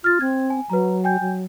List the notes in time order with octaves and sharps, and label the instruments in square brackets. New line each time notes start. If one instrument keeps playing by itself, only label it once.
[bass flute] F4 [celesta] F6 A6
[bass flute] C4 [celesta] G#6
[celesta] G#5
[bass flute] F#3 [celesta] B4 A#5
[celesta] G5 G#5 G6
[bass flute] F#3